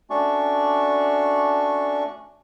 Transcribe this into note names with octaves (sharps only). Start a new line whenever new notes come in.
A3 C#4 D4 F#4 D5 C#6